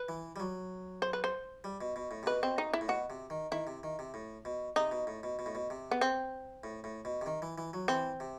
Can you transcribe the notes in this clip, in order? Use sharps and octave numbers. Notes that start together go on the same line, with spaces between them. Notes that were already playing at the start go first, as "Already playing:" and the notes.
Already playing: B4
E3
G3
F#3
C5
B4
C5
G3
B2
B2
A2
C3
B2 B4
C4
D#4
E4
A2
B2 F#4
C3
D#3
D#3 E4
C3
D#3
C3
A2
B2
C3 D#4
B2
A2
B2
B2
A2
B2
C3
B3
C4
A2
A2
B2
C3
D#3
E3
E3
F#3
E3 C4
C3